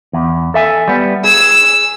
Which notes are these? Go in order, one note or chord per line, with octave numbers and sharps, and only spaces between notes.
E2
A4 E5 G#5
G3 B3
G#4 E6